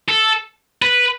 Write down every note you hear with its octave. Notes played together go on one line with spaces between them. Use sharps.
A4
B4